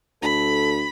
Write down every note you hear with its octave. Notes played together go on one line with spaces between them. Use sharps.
D2 A4 B5